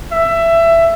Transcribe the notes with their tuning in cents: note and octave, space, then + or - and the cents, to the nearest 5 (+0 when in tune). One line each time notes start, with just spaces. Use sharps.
E5 +15